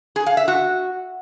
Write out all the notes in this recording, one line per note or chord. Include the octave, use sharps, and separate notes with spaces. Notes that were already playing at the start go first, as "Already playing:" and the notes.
G#4
F5
E5
F#4